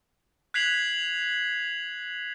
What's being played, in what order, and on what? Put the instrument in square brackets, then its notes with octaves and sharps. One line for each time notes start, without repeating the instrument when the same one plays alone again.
[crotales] F#6 G#6 B6 C7 F7 F#7